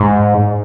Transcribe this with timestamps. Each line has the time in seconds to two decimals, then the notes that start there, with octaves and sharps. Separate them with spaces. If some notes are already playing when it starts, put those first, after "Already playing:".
Already playing: G#2